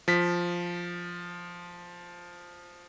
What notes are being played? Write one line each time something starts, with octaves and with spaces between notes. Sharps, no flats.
F3 B6